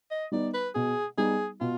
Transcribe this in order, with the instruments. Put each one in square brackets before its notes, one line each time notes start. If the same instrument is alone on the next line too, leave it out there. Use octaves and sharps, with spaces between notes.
[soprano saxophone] D#5
[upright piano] G3 B3 D#4 [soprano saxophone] D5
[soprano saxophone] B4
[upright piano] B2 [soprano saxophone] G#4
[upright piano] G3 B3 D#4 [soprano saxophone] G#4
[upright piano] B2 [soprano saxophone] F4